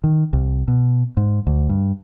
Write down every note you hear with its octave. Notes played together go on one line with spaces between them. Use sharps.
D#3
C2
B2
G#2
D2
G2